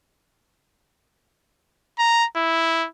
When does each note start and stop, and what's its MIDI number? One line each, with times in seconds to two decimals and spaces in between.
1.99 2.26 82
2.36 2.87 64